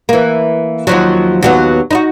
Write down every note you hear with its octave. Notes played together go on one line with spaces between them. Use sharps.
E3 A#3
D#2 F3 F#3
D#2 F#3 B3
D#4 E4 F#4